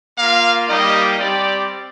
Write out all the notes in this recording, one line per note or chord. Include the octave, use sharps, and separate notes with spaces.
A#3 F4 F5
G3 A#3 D#4 G4 D#5
G3 C4 G4 D5